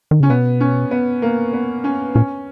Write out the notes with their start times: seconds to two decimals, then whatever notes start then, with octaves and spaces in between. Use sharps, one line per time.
0.11 D#3
0.20 C#3 C#4
0.30 B2 B3
0.61 C#4
0.91 B3
1.22 A#3
1.53 B3
1.84 C#4
2.15 A#2 C#4